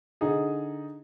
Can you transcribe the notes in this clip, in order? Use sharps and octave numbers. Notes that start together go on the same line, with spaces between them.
D3 D#4 G#4